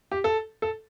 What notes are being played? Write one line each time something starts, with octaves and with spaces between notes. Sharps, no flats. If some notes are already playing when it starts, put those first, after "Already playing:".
G4
A4
A4